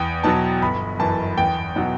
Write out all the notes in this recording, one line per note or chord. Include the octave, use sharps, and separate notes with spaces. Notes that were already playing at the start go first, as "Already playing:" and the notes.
Already playing: E2 G5
B2 F#3 A5
G1 B5
F#2 E3 A5
E2 G5
B2 F#3 F#5